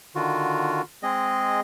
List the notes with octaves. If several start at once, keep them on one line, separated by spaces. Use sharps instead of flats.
D3 D#3 F4 F#4
G#3 C4 G#4 D#5